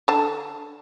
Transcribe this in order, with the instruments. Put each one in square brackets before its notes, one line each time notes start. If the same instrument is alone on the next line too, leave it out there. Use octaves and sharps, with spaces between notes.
[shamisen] D3 A5